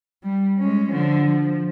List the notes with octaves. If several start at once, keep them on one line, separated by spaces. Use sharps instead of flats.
G3
G#3 C#4
D3 F3
F3